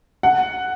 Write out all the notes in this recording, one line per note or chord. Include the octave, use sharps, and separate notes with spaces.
F#5